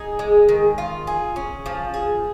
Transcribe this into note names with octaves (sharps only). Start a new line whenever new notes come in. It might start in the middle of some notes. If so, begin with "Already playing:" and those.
Already playing: D#4 G#4
G#3
D#3
F4
G#4
C#4
F3
G#4